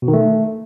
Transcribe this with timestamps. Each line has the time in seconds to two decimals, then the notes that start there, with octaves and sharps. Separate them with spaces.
0.02 B2
0.08 D#3
0.13 A3